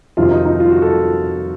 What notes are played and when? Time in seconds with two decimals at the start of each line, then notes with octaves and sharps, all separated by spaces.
0.17 F2 C3 D#3 F#3 F4
0.31 D#4
0.45 D#4
0.60 F4
0.71 F#4
0.82 A4